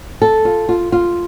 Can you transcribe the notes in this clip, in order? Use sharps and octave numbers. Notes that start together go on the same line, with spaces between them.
A4
F4
F4
F4